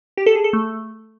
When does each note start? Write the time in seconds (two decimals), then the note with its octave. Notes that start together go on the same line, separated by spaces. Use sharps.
0.17 G4
0.26 A4
0.35 G#4
0.44 A4
0.53 A3